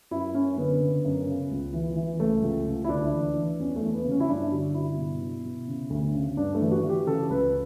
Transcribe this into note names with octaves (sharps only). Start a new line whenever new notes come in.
F#2 E4
F#2 C#4
D3 B3
C#3
F#2
C#3
C#2
E3
E3
C#2 A3
C#2
C#2
E4
D2 D4
E3
E3
E2 C#4
A3
E2
B3
C#3
C#4
E4
G2 D4
D3 F#4
G2 E4
B2
B2
B2
C#3
D2
C#3
G2 D4
A3
E3
F#4
E3
G4
C#3 A4
C#2 B4